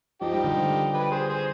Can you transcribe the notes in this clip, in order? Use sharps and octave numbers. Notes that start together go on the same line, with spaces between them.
F3 D#4 G4
G3
D3 F3
G4 B4
G#4 C5
G#4 C5